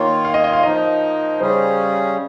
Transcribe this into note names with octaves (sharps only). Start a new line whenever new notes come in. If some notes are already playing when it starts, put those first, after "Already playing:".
Already playing: D#3 A#3 F4 C#5
F5
D#5
D#5
F5
F3 A#3 D#4 D#5
C#3 G3 C#4 G#4 C5